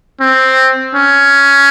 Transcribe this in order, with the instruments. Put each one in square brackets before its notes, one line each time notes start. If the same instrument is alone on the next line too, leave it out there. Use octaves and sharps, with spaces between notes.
[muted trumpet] C4
C#4